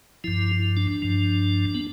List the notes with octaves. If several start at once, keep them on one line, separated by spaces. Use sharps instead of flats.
G2 F3 E4
D4
G2 F3
B3